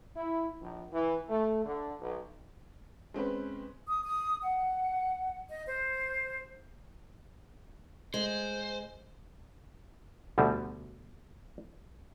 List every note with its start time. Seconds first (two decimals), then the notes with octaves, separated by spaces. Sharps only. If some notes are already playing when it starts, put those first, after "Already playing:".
0.16 E4
0.60 A#1
0.92 E3
1.29 A3
1.65 D3
2.00 B1
3.14 G#3 C4 C#4 B4
3.87 D#6
4.03 D#6
4.43 F#5
5.49 D#5
5.67 C5
8.14 G#3 C5
10.38 D2 B2 D3 G3